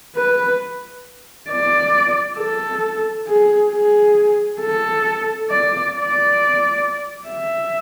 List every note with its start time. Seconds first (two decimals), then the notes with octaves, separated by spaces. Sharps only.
0.16 B4
1.49 D5
2.38 A4
3.27 G#4
3.72 G#4
4.61 A4
5.50 D5
5.94 D5
7.28 E5